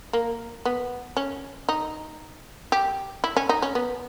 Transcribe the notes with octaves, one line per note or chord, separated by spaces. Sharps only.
A#3
B3
C#4
D#4
G4
E4
C#4
D#4
C#4
B3